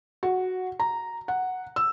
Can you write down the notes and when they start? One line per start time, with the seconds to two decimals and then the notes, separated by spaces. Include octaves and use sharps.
0.23 F#4
0.80 A#5
1.28 F#5
1.76 E6